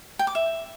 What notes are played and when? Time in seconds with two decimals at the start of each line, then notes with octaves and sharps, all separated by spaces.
0.19 G5
0.27 D6
0.35 E5